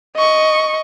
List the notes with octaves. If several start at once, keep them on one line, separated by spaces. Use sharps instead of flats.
D#5 C#6